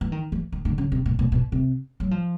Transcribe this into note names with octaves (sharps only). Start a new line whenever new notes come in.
E3
D#3
E3
D#3
D3
C#3
C3
B2
B2
B2
C3
F#3
F3